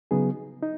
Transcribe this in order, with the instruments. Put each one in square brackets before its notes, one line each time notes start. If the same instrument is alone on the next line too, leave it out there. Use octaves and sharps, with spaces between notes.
[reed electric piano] C#3 F#3 B3 D#4 G#4
D#4